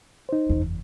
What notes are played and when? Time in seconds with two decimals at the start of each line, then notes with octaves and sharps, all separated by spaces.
0.29 D#4 C5
0.49 F#1 E2